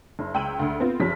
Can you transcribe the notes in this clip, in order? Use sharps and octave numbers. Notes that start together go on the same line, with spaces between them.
F#1
C#2 G5 E6 D#7 F#7
D2
B3 C4 F4
F#1 F3 C#4 G4 B6